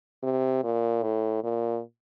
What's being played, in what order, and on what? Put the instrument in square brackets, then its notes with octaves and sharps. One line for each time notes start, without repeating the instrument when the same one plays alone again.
[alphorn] C3
A#2
A2
A#2